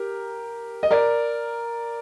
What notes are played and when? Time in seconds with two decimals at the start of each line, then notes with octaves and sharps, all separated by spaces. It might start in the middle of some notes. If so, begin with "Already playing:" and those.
Already playing: G4 A#4
0.83 D#5
0.91 A#4 D5